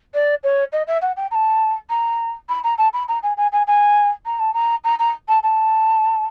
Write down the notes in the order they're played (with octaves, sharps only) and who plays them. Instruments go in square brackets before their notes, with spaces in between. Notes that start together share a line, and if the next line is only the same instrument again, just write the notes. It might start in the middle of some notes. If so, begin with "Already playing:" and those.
[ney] D5
C#5
D#5
E5
F#5
G5
A#5
A5
A#5
B5
A#5
A5
B5
A#5
G#5
G#5
G#5
G#5
A#5
A5
A#5
A#5
A#5
A5
A5